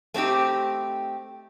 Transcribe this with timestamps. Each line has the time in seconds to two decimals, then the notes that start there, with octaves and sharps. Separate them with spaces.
0.14 A3 C4 D#4 G4